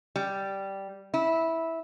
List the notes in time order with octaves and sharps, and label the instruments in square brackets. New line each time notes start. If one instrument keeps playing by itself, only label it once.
[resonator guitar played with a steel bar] G3
E4